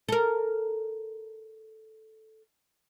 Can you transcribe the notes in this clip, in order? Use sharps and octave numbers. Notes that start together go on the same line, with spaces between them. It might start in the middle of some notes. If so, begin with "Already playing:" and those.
A4 A#4